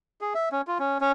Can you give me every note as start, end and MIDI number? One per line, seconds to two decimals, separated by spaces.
0.21 0.33 68
0.35 0.49 76
0.52 0.61 61
0.67 0.78 65
0.79 0.98 61
1.01 1.12 61